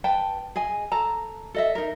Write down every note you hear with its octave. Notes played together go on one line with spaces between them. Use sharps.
B4 G5 A5
G#4 D#5 G#5
A4 A5 A#5
A4 D#5 E5
D#4 A#4